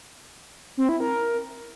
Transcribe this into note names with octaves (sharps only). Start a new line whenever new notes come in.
C4
E4
A#4